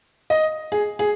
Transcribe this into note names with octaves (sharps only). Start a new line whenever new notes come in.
D#5
G#4
G#4